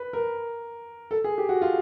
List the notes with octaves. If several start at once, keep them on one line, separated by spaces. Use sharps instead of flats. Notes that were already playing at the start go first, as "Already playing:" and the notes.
Already playing: B4
A#4
A4
G#4
G4
F#4
F4